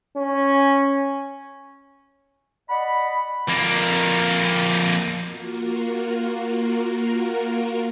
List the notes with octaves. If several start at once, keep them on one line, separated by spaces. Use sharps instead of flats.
C#4
D5 D#5 F#5 B5
F2 A#3
A#3 F4 F#4 A#4